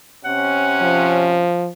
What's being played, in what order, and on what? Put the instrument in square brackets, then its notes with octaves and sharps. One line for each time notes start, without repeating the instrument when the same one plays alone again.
[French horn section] C3 C#4 [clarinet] F#5
[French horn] F3